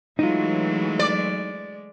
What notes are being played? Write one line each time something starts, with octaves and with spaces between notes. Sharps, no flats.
E3 F#3 G#3 A3 D#4 F4
D5